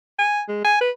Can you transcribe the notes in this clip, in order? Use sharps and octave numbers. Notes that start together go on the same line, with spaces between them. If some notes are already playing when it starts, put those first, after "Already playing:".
G#5
G#3
G#5
B4